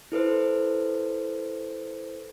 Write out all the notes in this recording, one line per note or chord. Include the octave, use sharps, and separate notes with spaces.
E4 A4 B4 C5